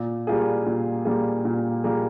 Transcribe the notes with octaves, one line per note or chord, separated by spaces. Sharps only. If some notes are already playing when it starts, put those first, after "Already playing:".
Already playing: A#2
G3 A#3 F4 G#4
A#2
G3 A#3 F4 G#4
A#2
G3 A#3 F4 G#4